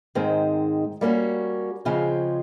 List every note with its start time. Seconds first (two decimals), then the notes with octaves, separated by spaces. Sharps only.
0.15 G#2 D#3 G#3 C4
1.01 G3 A#3 C#4 F#4
1.85 C#3 F3 G#3 C4